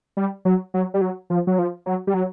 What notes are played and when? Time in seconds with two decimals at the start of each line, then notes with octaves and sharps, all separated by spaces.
0.17 G3
0.45 F#3
0.74 F#3
0.94 G3
1.01 F#3
1.30 F3
1.47 F#3
1.59 F3
1.86 F#3
2.07 G3
2.14 F#3